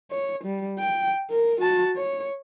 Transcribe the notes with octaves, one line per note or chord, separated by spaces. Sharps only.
C#5
G3
G5
A#4
F#4 A5
C#5